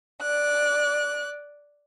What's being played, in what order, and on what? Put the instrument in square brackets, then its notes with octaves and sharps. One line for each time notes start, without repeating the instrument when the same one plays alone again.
[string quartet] D5 F#6